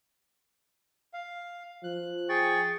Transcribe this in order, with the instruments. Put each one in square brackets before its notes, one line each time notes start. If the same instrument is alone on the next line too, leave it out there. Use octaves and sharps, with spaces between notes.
[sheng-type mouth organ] F5
[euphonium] F3 [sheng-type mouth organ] F#6
[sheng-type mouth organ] G#4 G5 C#6 [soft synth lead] A6